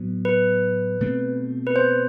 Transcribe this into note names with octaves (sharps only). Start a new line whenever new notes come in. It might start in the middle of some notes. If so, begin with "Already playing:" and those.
Already playing: A2 F#3 B3
B4
B2 A3 C4
B4
C5